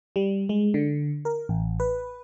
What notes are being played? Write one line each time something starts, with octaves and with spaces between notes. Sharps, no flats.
G3
G#3
D3
A#4
A1
B4